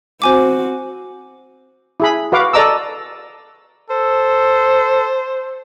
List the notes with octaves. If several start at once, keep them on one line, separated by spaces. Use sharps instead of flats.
C4 F#4 C5 G#5 D6
E4 G#4 B5
F#4 B4 F5 D6
A4 D5 D#5 A#5 D6 E6
A4 C5